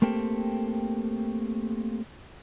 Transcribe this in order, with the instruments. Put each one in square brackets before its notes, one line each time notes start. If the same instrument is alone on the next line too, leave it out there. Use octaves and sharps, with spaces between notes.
[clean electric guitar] A3 A#3 C4 G4 A4